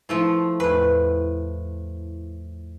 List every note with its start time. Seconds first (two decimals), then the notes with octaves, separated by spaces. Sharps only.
0.09 F3 A3 E4 F4 C6
0.60 E2 A2 A3 B4 C#6